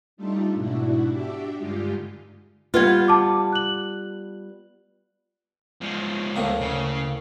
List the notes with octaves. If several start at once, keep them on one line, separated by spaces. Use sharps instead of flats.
G3 A3 D4 D#4 F4 A4
G#2 B2 D4 E4 F#4
D4 F#4 G4 E5 D6
G2 D3 G#3 D#4 F4 G4
G3 B3 F4 B4 F6 G#6
A5 D6
F#6 F#7
F3 G#3
D2 A2 A#3
C#3